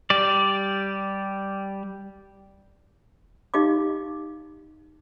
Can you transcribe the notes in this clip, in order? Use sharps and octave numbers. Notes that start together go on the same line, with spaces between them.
G3 D5
D#4 G4 D#5 F5 D6